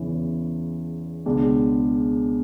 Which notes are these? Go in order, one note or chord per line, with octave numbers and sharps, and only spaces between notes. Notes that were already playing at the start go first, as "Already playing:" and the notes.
Already playing: E2 C#3 E3
C#2 B2 G#3 D4